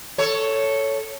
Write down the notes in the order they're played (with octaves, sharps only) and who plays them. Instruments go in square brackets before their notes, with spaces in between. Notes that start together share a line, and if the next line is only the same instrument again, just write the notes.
[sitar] A4 C#5